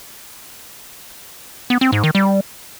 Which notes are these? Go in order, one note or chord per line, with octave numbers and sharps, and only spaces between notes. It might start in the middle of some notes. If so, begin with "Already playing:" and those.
B3
C4
G#2
D#3
G3